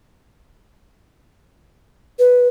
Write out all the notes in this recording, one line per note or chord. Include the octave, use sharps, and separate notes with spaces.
B4